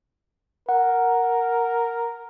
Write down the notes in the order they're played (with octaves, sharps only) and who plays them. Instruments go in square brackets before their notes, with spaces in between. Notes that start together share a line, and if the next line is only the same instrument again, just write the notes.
[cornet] A#4 [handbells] F#5